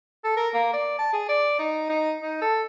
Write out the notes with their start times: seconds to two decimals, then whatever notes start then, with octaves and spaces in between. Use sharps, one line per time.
0.24 A4
0.37 A#4
0.54 A#3
0.73 D5
0.99 A5
1.13 G#4
1.29 D5
1.59 D#4
1.89 D#4
2.22 D#4
2.42 A4